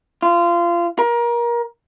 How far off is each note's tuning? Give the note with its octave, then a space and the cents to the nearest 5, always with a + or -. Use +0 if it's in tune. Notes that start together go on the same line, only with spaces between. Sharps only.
F4 -25
A#4 +25